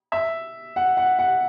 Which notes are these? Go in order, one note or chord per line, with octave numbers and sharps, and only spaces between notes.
E5
F#5
F#5
F#5